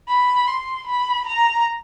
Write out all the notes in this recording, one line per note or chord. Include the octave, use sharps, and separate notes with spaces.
B5
C6
B5
A#5